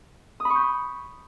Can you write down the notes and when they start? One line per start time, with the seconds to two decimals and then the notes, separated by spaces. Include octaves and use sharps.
0.40 D#6
0.45 B5
0.50 C#6
0.55 G6